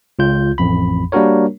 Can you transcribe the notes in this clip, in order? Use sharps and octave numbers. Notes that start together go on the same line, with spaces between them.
C#2 F4 G6
A1 F2 B5
G3 A#3 D4 F#4 A#4 C#5